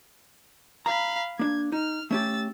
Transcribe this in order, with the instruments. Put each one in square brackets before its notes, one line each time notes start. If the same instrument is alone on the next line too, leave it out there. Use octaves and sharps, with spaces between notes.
[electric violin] F5 B5 [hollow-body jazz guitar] A#5
[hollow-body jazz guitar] A#3 D4 [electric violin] G#6
[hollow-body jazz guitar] D#4 [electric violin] F6
[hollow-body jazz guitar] A3 C#4 G4 [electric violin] E6 A6